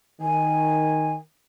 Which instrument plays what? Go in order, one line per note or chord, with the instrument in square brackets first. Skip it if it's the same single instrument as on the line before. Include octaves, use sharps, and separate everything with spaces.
[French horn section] D#3 [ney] G#5